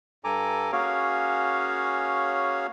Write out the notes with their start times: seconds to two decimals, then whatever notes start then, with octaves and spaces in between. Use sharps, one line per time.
0.24 G2 A4 G#5 A#5 D6
0.72 A#3 C#4 F#4 G#4 C#5 F5